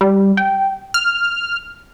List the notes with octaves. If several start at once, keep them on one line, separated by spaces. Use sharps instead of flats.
G3
G5
F6